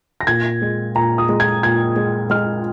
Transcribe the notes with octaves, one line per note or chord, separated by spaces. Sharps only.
A#6
A#2 G#6
G#3
A#2 A#5
D#6
G#3
G#6
A#2 G#6
G#3
G#3 F6